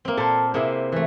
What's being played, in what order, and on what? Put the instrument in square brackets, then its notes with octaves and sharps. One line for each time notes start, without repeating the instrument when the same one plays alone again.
[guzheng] A#3 C4
[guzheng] A#2 C5 [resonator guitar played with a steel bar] A4
[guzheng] C3 A#3 [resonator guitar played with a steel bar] E4 G#4 C5
[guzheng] E3 A3